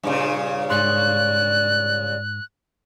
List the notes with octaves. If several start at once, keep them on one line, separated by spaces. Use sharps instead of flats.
G2 A#2 C#3
G#2 D5 C6 F#6